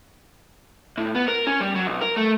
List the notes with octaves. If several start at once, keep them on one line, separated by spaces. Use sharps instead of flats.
A2
B3
A#4
C#4
G3
F#3
B1
A#4
A3